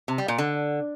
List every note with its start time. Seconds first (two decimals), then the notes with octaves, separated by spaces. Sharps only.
0.08 C3
0.18 G3
0.28 A#2
0.38 D3